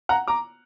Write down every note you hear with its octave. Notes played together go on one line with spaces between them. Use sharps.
F#5 A#5
A#5 D6